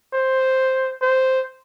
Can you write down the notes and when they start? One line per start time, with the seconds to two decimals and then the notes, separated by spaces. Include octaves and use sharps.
0.13 C5
1.02 C5